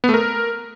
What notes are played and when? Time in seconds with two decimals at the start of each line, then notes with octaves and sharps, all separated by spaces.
0.04 B3
0.09 A3
0.14 A#4